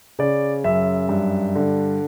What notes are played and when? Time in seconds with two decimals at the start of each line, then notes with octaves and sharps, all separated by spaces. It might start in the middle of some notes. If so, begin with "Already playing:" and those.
0.19 C#3 D5
0.64 F#2 E5
1.09 G2
1.55 D3